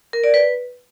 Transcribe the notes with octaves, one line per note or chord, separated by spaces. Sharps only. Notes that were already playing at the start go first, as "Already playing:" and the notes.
A#4
D5
B4